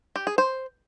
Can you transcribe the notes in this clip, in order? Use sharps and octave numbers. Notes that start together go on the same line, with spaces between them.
G4
G#4
C5